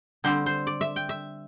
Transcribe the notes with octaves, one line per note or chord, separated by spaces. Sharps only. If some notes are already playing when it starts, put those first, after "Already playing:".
D3 G3 C4 C5
C5
D5
E5
G5
E5